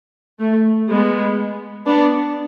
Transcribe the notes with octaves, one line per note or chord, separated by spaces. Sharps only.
A3
G#3 B3
B3 D4